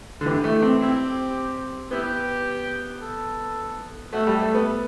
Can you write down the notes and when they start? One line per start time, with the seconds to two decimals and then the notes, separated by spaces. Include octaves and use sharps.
0.21 D3
0.26 E3 G4
0.44 A3
0.62 C4
0.81 C4 E4 G4
1.91 B3 E4 G4
3.01 A4
4.13 A3 F#4 A4
4.27 G3
4.41 A3
4.54 B3